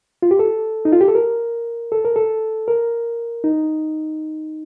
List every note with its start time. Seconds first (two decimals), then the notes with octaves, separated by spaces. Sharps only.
0.22 F4
0.31 G4
0.39 A4
0.85 D#4
0.92 F4
1.01 G4
1.08 A4
1.15 A#4
1.92 A4
2.05 A#4
2.16 A4
2.68 A#4
3.44 D#4